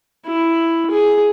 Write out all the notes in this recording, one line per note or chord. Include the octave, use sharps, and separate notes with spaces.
E4
G#4